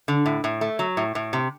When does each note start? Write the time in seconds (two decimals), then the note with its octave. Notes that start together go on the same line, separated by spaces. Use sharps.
0.08 D3
0.26 A2
0.44 A2
0.61 A3
0.79 F#3
0.97 A2
1.15 A2
1.33 C3